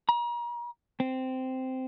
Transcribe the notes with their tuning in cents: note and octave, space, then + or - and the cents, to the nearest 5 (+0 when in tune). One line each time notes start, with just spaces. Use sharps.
A#5 +40
C4 -10